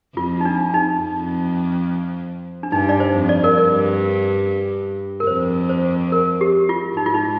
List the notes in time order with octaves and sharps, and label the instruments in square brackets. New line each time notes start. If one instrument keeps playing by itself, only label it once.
[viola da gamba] F2 [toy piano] F4
[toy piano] D#4
D4
D#4
[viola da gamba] F2
[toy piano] D4
[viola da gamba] G2 [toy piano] D#4
[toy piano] D5
C5
[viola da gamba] F2
[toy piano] D5
A#4 D5
[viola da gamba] G2 [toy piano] A#4 D5
[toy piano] A#4
[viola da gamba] F2 [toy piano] C5
[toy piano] C5
A#4
G4
F4
[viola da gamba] G#2 [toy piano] D#4
[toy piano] F4
D#4